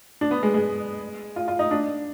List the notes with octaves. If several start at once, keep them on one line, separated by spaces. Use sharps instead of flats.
D4
B3
G#3
G#3
F4
F4
D#4
D4